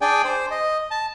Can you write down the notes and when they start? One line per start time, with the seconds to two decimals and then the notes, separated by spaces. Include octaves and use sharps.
0.01 D4 G#4 D5 G5 G#5
0.24 C5
0.51 D#5
0.91 A5